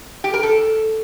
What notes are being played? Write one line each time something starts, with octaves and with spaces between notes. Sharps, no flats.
G4
A#4
A4